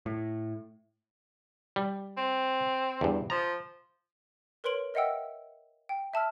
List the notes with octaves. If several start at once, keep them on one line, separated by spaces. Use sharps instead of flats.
A2
G3
C4
E2 G2
F3 A#5
A#4 B4 C#5 C6 D7 F#7
A#4 D#5 E5 F#5 G5 E6
G5
E5 A5 E6 F6